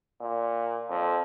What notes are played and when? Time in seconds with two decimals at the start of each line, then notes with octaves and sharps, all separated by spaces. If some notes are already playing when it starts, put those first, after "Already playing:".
0.21 A#2
0.89 F2